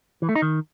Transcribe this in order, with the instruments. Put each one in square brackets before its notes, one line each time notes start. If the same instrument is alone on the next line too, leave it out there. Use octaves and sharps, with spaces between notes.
[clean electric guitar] E3
A3
D#4
D#3